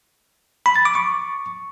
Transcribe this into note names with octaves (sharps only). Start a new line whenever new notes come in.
B5
A6
D6
C#6